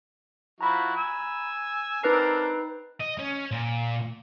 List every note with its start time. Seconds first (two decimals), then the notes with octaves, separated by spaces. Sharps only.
0.61 F3 E4 F#4 A#5 B5
0.96 G#5 E6
2.03 C4 D4 D#4 A#4 B4 C7
3.00 D#5
3.19 C#4
3.51 A#2